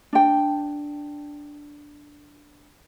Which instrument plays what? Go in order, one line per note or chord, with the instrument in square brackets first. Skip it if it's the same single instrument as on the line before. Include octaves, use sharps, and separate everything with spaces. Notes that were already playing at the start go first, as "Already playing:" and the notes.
[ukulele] D4 G5